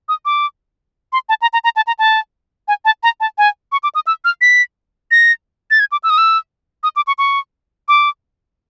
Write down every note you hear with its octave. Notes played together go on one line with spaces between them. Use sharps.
D#6
D6
C6
A5
A#5
A#5
A#5
A5
A#5
A5
G#5
A5
A#5
A5
G#5
C#6
D6
D#6
E6
F6
B6
A#6
A6
G#6
D6
E6
D#6
E6
D#6
D6
C#6
C#6
D6